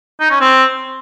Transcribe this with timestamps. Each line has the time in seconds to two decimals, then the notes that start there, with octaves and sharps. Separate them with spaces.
0.21 D#4
0.31 C#4
0.41 C4